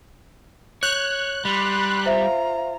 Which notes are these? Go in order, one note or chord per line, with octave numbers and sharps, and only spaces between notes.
C#5 F#6 G6
G3 B5 C6
F4 C5 E5 F5 A#5